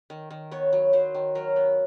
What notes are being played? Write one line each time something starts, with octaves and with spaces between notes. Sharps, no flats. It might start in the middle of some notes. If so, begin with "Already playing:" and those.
D#3
D#3
B3 C#5
F#3
F#3 C5
D#3
F#3 A#4
B3